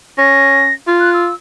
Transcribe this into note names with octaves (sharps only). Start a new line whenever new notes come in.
C#4 A#6
F4
F#6
E6